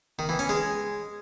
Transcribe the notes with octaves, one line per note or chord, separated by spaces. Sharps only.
D#3
E3
C#4
G#3